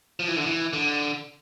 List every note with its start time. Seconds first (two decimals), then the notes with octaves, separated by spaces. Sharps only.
0.20 F3
0.28 E3
0.37 D3
0.46 E3
0.73 D3